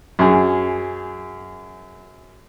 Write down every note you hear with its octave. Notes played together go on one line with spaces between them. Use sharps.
F#2 G#4